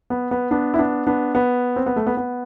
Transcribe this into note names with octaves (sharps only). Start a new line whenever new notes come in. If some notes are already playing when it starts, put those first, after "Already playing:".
B3
B3
B3 D4
E4
B3 D4
B3 D4
B3
C4
B3
A3
B3
B3